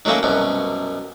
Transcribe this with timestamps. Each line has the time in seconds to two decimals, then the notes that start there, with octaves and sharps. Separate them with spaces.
0.05 D#3 F#3 A3 A#3 C#4
0.23 C2 F#2 B2